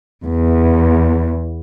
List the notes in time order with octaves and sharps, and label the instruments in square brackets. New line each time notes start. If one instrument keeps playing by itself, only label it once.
[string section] E2